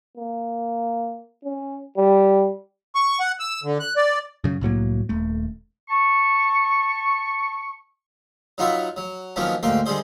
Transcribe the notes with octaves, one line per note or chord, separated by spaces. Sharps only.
A#3
C#4
G3
C#6
F#5
E6
D3
F#6
D5
F#2 C#3
C2 A2 F#3 A#3
D#1 A3
A5 C#6
F#3 D#4 F4 F#4 B4 E5
F#3
D#3 F3 F#3 A#3 B3 C#4
D2 G#2 A#3 G5 C6
D3 G3 G#3 G#4 C5